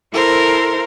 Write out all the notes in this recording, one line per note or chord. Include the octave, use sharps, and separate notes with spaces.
E4 A4 A#4 C5